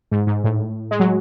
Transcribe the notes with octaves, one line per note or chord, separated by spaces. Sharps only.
G#2
G#2
A2
G#3
F#3